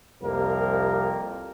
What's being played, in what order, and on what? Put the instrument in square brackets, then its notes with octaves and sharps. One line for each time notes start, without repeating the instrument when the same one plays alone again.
[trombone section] C2 F2 A#3 G4 A#4